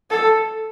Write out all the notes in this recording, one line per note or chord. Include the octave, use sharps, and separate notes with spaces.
A4